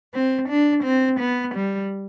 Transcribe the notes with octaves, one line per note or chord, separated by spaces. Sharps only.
C4
D4
C4
B3
G3